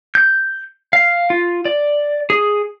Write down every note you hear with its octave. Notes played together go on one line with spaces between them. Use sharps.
G6
F5
F4
D5
G#4